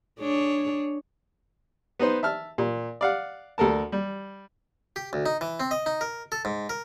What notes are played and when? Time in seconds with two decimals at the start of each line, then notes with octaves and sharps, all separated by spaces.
0.18 D4 G#4 C#5
1.99 B3 D#4 B4 C5
2.23 E5 A5 F6
2.58 A#2
3.01 D5 F5 F#5
3.58 D2 A4 A#4 A5
3.92 G3
4.96 G4
5.13 D2
5.26 D#4
5.41 E3
5.60 C4
5.71 D#5
5.86 D#4
6.01 A#4
6.32 A4
6.45 G#2
6.69 A#4